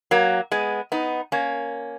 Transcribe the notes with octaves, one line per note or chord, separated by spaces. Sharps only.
F#3 A#3
G#3 B3
B3 D#4
A#3 C#4